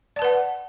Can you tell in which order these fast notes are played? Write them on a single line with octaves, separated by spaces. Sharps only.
D5 A5 B4 F#5